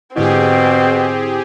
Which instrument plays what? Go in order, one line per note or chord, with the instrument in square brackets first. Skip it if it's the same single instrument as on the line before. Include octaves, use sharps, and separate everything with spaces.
[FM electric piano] G#2 D3 E4 [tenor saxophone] B2 [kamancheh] C4 [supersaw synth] G4 G#4